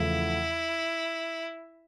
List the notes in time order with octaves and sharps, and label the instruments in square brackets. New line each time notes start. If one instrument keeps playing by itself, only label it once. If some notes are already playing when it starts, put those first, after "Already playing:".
Already playing: [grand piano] E2 C#3 F3 A3 [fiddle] E4